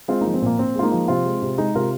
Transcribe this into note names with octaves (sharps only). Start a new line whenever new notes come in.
G#3 C4 F4
F3 A#3 D#4
C4
A#2 A#3
A#2 C4
G#3 F4
A#3 D#4
F3
C3 C4 F4
G#3
C3
G#3 D#4 G#4
C3 F4 A#4